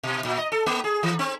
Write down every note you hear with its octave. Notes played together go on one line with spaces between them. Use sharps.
B2
A#2
D#5
A4
A#3
G#4
E3
C4